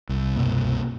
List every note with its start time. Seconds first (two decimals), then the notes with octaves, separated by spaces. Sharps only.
0.09 C2
0.36 C2 F#2 B2 A#3